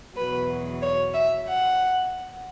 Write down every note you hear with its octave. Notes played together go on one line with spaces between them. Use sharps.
E2 B2 F#3 B4
C#5
E5
F#5